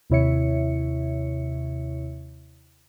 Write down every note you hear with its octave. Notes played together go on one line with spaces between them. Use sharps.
D#2 C3 E4 C#5 E5 C#7